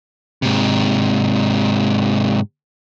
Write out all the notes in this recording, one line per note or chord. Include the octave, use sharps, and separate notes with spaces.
G#2 C3